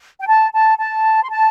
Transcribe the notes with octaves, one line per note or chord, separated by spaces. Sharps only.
G5
A5
A5
A5
C6
A5